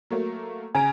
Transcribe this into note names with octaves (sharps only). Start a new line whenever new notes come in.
F#3 A3 A#3
C#3 G#5 A#5 D7